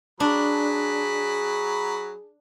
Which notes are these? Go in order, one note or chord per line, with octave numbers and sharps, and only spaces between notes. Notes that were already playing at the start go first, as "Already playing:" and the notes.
F#3 D4 G#4 B5